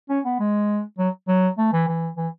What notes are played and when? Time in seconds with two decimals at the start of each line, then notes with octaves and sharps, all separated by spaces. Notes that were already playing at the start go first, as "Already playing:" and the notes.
0.10 C#4
0.25 B3
0.40 G#3
0.98 F#3
1.28 F#3
1.58 A3
1.73 E3
1.88 E3
2.17 E3